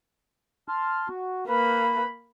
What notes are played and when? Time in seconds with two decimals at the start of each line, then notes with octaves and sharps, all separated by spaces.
0.68 A5 C6 F6
1.08 F#4
1.48 A#3 B4 B5